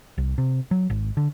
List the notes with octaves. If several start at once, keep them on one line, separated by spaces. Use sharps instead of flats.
C2
C3
F#3
G#1
D3